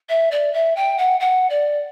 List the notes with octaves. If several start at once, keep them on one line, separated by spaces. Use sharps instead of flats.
E5
D5
E5
G5
F#5
F#5
D5